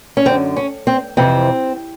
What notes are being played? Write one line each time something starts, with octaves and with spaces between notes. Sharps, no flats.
C#4
F#2 D3 C4
C#4
C4
F2 C3 E3 C4